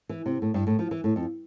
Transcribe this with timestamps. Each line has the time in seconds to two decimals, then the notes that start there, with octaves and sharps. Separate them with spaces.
0.09 E3
0.26 C3
0.42 A2
0.54 G2
0.67 A2
0.79 F3
0.91 E3
1.04 A2
1.16 F2